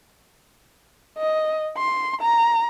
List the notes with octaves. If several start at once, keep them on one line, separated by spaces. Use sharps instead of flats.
D#5
C6
A#5